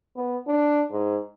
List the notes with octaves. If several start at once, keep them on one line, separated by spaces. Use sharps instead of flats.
B3
D4
G#2